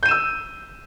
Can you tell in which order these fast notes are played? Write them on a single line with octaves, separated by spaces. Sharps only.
G6 D#7 E7 E6